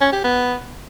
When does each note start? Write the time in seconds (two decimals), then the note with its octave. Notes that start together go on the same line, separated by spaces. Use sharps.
0.01 C#4
0.13 G4
0.24 B3